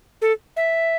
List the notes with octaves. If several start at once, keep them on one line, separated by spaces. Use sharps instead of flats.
A4
E5